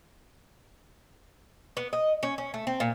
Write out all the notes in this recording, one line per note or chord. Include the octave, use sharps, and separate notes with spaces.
B3
D#5
C#4
C#4
A3
C4
A#2